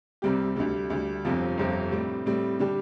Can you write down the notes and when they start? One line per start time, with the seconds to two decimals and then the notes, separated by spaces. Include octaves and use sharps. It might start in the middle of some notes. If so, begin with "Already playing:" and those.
0.22 C2 C3 G3 C4 G4
0.56 D2 D3 G3
0.90 D2 D3 G3
1.25 G1 F2 C3 F3 C4
1.58 G1 F2 C3 F3 C4
1.91 A2 G3 C4
2.26 A2 G3 C4
2.59 D3 G3 D4 G4